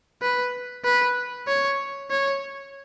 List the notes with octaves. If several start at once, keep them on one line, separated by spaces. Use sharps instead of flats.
B4
B4
C#5
C#5